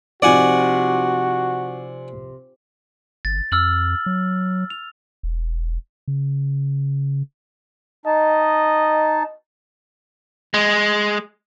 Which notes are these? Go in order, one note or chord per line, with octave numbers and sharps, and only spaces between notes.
C3 F3 D#4 F#4 D5 F#5 G#5
G1 A6
F2 E6 F6 F#7
F#3
F7
E1
C#3
D#4 D#5 A5
G#3